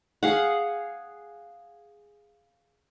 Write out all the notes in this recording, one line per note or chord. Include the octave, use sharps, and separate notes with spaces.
G#4 F5 F#5